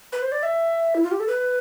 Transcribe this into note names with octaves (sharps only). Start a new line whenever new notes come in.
B4
C5
D5
E5
E4
F4
G4
A4
B4